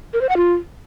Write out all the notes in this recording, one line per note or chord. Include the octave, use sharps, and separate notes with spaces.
A#4
C5
F#5
F4